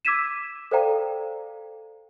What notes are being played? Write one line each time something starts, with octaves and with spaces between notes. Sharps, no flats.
D6 E6 G#6 B6 D#7 E7
A4 C5 D5 F5 G5 A#5